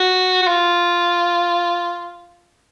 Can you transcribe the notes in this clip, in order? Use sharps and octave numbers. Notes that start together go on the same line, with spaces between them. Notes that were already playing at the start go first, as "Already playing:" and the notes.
Already playing: F#4
F#4
F4